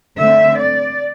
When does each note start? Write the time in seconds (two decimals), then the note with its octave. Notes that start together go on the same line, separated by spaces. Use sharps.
0.19 D3 A3 C4 E5
0.60 D5